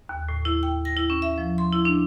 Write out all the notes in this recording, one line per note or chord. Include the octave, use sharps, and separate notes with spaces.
D#2
A2
E4
G5
A#6
E4
C#4
E5
F3
C6
E4
D4